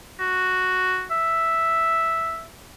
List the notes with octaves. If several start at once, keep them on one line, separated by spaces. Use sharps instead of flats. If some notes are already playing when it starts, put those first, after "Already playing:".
F#4
E5